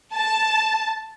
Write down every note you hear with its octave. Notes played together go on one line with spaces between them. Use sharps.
A5